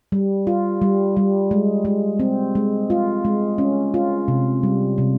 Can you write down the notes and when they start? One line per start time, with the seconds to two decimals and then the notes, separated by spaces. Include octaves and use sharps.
0.12 G3
0.47 F4
0.82 G3
1.17 G3
1.51 G#3
1.85 G#3
2.20 C4
2.55 G#3
2.90 F4
3.25 G#3
3.58 C#4
3.94 F4
4.28 C3
4.63 G3
4.98 C3